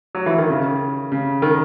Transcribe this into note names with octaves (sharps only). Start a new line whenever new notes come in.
F#3
E3
D#3
C#3
C#3
D#3